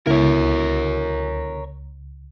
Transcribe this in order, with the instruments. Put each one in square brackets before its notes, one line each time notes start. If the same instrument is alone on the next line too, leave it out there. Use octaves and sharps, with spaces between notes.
[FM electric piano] C#2 [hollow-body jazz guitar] B2 D3 E4 [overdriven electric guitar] A#4 C#5